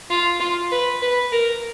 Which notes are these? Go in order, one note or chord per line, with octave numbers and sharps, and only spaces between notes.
F4
F4
B4
B4
A#4